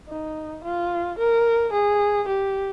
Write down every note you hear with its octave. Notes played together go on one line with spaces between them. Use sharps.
D#4
F4
A#4
G#4
G4